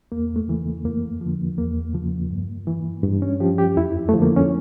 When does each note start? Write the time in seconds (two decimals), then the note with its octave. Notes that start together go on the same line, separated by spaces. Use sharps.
0.12 E2 A#3
0.36 A3
0.47 C#3 E3
0.85 F2 A#3
1.21 D3 F3
1.58 E2 A#3
1.94 C#3 F3
2.31 G2
2.67 E3
3.03 G2
3.22 C#4
3.40 F3 G4
3.58 G4
3.77 F2 E4
4.09 D3 F3 A3
4.22 A#3
4.36 C#4